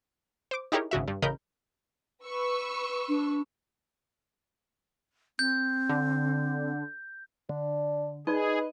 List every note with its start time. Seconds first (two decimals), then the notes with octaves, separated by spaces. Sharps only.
0.51 C5 D6
0.72 D#4 E4 G4 G#4 A#4 C#5
0.91 G#1 C#3 F#4 E5
1.08 G2
1.22 A1 C#3 A#4 D#5 B5 G6
2.25 B4 C#6 E6
3.08 D4
5.39 C4 G6
5.89 D3
7.49 D3 D4
8.27 D#4 G#4 B4 D5 D#5